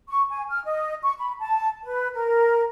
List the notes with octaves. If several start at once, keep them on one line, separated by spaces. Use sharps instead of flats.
C#6
G#5
F6
D#5
C#6
B5
A5
B4
A#4